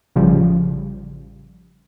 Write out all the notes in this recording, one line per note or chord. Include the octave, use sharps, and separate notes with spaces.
A1 C#3 F3 G3